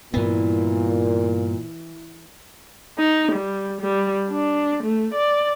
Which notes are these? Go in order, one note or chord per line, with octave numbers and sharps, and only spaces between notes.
G2 A#2 E3 B3
D#4
G3
G3
D4
A3
D5